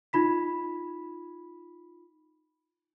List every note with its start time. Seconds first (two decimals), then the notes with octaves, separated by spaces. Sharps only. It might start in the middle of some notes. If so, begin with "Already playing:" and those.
0.13 D#4 F4 B5 B6